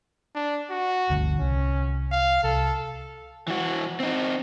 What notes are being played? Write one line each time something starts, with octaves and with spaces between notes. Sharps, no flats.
D4
F#4
G1 D2 D3
C2 C#4
F5
C2 A4
E3 F#4
C4 D#4